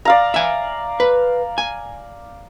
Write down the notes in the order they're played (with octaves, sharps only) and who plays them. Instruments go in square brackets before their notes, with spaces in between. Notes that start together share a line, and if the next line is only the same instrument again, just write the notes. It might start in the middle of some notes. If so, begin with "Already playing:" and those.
[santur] D5 F5 A#5
[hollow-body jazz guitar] E5 G#5
B4
G#5